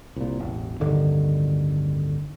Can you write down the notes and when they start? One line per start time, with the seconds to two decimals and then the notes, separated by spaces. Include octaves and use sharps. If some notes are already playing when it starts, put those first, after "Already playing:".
0.16 C2 A#2
0.40 E1 A1
0.80 D1 G2 D3 D#3